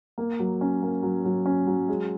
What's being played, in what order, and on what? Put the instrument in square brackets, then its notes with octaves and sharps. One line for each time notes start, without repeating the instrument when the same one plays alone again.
[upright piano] A#3
F#3
C#4
A#3
F#3
F#3
C#4
F#3
G#3